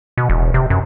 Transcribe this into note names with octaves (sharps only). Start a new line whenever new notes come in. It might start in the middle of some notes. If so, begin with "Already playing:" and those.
B2
E1
C3
F#2